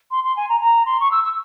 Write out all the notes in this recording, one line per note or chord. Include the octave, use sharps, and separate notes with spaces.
C6
C6
G#5
A#5
A#5
C6
C#6
E6
E6